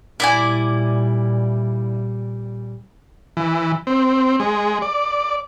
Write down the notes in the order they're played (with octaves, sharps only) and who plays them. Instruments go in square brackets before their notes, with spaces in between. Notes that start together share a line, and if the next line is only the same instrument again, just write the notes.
[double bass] A#2 G3 [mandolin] E4 D5 G#5
[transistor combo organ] E3
C4
G#3
D5